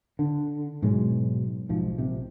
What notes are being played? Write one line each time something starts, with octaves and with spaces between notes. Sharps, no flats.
D3
G#2 B2 F#3 G#3
B1 G#2 F3
A#1 C3